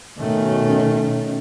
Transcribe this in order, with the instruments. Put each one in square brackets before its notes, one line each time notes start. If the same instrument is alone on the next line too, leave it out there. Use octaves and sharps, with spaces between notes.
[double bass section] B2 C#4 [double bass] D#3 A3